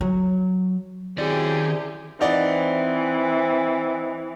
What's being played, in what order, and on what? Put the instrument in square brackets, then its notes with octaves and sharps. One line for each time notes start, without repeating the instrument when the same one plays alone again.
[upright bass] F#3
[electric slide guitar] D#3 D5 [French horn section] F#3 C4 E4 [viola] G4 G#4
[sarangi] E3 [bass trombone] C4 [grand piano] D#4 D5 F#5